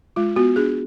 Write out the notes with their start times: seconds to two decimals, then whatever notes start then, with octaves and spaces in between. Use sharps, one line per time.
0.16 G#3 F4
0.36 B3 F#4
0.56 D4 G#4